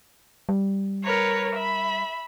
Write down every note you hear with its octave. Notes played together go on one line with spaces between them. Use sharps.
G3
A#4 B4 C#5
E5 B5